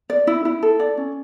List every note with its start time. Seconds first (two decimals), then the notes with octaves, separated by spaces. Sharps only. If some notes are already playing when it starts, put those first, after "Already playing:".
0.10 D5
0.27 E4
0.45 E4
0.63 A4
0.80 D5
0.97 C#4